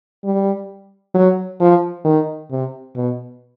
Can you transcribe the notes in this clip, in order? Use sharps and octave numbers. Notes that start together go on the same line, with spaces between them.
G3
F#3
F3
D#3
C3
B2